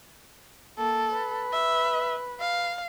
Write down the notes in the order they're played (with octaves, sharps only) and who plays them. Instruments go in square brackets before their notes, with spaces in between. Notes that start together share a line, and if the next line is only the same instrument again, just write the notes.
[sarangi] A#3 [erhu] A4
[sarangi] B4
[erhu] E5
F5